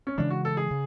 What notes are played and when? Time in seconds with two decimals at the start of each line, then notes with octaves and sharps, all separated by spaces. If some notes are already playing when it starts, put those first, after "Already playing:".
0.07 C#4
0.18 C#3 E3 G#3 D4
0.30 F#4
0.45 A4
0.57 G#4
0.71 C#3